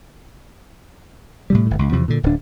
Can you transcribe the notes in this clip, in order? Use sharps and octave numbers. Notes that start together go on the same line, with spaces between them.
A2 C3 G3
G1 A2
C#2
E2 C3 F3
A#2 D3
D1 D4